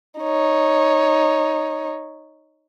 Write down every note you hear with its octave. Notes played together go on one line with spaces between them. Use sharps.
D#4 C#5